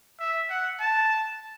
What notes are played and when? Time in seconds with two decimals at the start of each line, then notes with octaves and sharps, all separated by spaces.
0.20 E5
0.50 F#5
0.80 A5